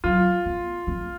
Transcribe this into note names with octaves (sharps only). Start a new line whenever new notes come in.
F#3 F4
B3
A#3